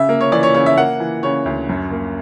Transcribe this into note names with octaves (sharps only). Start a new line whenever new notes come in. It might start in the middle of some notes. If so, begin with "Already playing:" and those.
Already playing: C#3 E5
A#3
C#5
E3 D5
C#5
C#3 C#5
E5
A#3 F#5
E3
C#3 C#5
D2
F#2
A#3